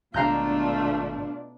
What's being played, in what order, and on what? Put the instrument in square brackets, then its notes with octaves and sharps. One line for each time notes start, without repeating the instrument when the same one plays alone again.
[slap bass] G#1 [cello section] B2 D4 [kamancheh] A3 F4 [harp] F5 A#5 G6